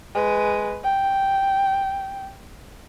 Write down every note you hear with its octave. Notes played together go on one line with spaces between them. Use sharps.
G#3 B4
G5